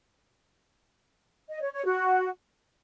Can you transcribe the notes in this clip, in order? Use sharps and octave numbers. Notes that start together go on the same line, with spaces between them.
D#5
C#5
C#5
F#4